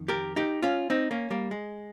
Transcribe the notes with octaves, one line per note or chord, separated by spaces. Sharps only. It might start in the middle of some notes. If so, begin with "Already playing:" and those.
Already playing: F2 D#3
G4 A#4
D#4 G4
C#4 F4
C4 D#4
A#3 C#4
G3 A#3
G#3